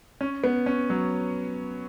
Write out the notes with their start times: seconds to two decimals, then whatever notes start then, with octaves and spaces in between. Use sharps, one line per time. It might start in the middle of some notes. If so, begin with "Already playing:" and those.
0.21 C#4
0.44 B3
0.66 C#4
0.90 F#3